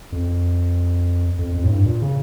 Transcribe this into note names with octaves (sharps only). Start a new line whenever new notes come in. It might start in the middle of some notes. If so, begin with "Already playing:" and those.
F2
F2
F2
A2
G2
A#2
C#3